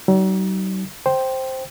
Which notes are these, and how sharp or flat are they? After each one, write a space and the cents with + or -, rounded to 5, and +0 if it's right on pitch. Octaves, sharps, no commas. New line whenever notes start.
F#3 +45 D#4 +0
C5 +5 G5 -5